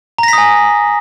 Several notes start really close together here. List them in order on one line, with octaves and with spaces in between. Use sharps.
A#5 A#6 B6 D#6 G#5